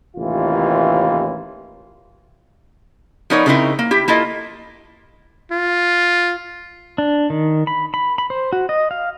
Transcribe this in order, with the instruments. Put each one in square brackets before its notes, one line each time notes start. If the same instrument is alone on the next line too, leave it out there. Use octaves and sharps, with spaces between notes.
[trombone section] A1 D#2 C3 E3 F4
[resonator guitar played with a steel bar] F3 B3 D#4 A#4 C#5 D5
C#3 A3 C4 D#4 E4 A#4
A#3
E4 G4
A#3 E4 F4 A4 D#5
[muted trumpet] F4
[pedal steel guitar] D4
D#3
B5
B5
B5
C5
F#4
D#5
F5